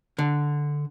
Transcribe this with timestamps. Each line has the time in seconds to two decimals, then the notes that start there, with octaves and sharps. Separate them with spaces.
0.19 D3